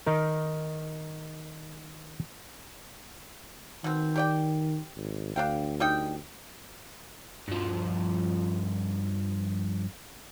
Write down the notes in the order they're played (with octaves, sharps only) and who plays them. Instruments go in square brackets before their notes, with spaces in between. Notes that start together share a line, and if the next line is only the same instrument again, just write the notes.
[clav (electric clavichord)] D#3 D#4 A#4
[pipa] B2 C4 [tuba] D#3
[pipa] G4 D5 G5
[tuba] G#1
[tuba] D2 [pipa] D4 F5 G5
[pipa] G3 D#4 G5
[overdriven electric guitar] G2 F3